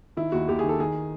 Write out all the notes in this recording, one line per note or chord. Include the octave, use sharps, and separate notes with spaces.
D#3 E4
D#2 F#4
D#2 G4
G#4
D#3
A4
D#3 G#4